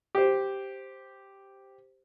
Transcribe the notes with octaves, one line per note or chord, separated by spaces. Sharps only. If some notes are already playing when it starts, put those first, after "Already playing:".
G4 C5